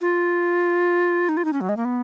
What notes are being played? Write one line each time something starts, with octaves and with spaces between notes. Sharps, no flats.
F4
D#4
F4
D#4
C#4
F#3
G#3
A#3
B3